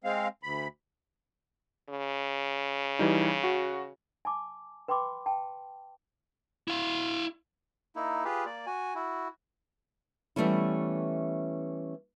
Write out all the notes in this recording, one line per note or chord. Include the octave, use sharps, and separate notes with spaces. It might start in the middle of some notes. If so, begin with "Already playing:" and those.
G#3 C4 F5
D2 B5
C#3
E3 G3 D#4
F#4
G#5 A5 D6
B4 G5 B5 C6 D6
G5 A5
E4 F5
A#3 D#4 E4
F4 G4 G#4 B4
A#3 D5
F#4 G#5
E4 F#4
E3 G3 A3 B3 C#4 E4